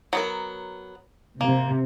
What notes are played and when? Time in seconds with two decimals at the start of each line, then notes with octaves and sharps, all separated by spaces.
0.13 F#3 B3 A#4
1.41 C3 A#3